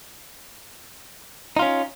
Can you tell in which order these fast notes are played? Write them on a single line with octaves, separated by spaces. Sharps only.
D#4 F4 C#4